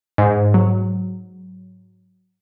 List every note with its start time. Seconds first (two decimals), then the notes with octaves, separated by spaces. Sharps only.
0.18 G#2
0.54 F#3